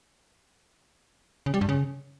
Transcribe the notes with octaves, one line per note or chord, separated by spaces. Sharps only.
C#3
G3
G2
C#3